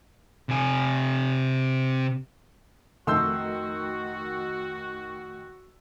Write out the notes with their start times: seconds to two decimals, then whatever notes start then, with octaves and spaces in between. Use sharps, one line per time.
0.49 C3 G#5
3.07 F2 D#3 A3 F#4 C6 E6 G6